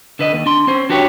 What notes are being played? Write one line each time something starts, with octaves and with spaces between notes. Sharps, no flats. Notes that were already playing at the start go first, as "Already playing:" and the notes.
D3 B4 D#5
D#2
D4 C6
C#4 C5
D4 F#4 G4 B4 C#5